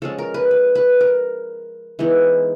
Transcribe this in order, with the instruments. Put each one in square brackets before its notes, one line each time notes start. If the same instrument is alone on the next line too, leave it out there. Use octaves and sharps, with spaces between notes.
[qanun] F3 G#3 C#4 A4
A#4
B4
B4
B4
A#4
E3 G#3 B3 D#4